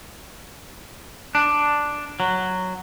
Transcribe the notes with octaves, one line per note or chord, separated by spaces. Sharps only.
D4
F#3